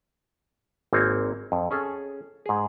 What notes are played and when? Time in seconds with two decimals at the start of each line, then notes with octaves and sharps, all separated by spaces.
0.93 G#1 A#3 C4 C#5 G#5
1.52 F2
1.71 C#4 G#4 A4
2.46 G#2 G#4